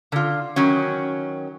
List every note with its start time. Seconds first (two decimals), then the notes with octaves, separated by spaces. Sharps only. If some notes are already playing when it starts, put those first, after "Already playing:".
0.12 D3 F4
0.56 D#3 F#3 C#4